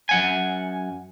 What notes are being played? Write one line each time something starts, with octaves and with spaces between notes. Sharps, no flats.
F#2 F#5 G#5